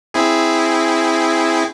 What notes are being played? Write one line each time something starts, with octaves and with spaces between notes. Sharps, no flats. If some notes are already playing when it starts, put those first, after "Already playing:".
C4 E4 G#4